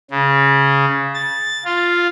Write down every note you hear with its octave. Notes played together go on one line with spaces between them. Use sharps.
C#3
A6
F4